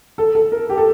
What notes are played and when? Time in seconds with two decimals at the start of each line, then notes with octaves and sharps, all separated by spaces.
0.18 A4
0.35 A4
0.52 A#4
0.69 G4
0.77 A4